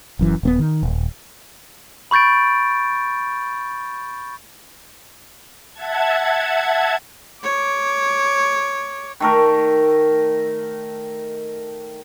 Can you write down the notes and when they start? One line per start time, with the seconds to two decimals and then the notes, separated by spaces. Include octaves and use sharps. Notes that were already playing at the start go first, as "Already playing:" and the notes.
0.19 F#1 F#2 E3
0.43 D#1 A#3 B3
0.59 D#3
0.83 D#1
2.11 B5 C#6 G6 A6 D7
5.73 E5 F#5 A5 G#6
7.43 C#5 D6
9.20 D#3 A3 A#4